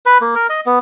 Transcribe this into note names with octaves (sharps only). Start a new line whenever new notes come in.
B4
A#3
A#4
D#5
B3